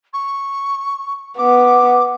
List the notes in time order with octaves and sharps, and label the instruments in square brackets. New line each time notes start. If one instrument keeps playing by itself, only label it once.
[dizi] C#6
[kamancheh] B3 [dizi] D6